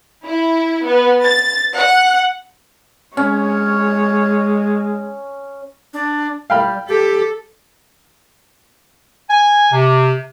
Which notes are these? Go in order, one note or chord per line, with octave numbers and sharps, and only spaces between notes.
E4
B3
A6
F#5
G#3 C#4 C#5
D4
G3 F5 G5 B5
G4 A4
G#5
C3